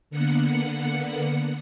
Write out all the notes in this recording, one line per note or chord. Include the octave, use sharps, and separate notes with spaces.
D3 A#3 B3 F#5 C#7